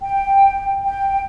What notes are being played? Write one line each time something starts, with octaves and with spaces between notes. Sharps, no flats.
G5
G5